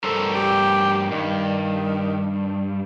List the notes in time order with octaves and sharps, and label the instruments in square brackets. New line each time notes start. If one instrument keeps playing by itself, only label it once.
[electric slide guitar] G2 A#4 C5 [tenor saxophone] A4
[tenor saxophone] G4
[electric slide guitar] G2 [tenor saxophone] D#3